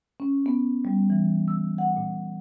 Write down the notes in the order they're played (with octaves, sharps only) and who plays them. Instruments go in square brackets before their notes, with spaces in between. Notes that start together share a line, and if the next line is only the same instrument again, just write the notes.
[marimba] C#4
B3
G3
E3
E6
F#5
A#2